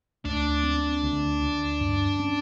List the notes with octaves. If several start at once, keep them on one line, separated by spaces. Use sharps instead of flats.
D2 D4
C4
D2
D2
G2
C#4